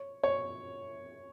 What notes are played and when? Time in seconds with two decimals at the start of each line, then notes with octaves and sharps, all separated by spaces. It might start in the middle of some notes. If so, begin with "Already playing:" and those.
Already playing: C#5
0.24 C#5